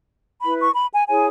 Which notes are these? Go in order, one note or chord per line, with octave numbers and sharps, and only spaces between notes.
E4 B4 B5
C#6
B5
G#5
E4 G#4 C#5 G#5